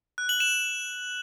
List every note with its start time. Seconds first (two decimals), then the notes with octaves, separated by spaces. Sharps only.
0.18 F#6
0.29 F#7
0.40 E7